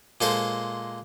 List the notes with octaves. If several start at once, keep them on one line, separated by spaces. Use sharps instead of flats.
A#2 G#3 A4 C5